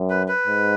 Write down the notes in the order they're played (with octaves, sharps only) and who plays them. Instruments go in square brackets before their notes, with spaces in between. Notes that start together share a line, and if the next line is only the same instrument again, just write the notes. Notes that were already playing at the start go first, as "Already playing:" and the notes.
Already playing: [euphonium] F#2
[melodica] B4
B4
[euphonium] G#2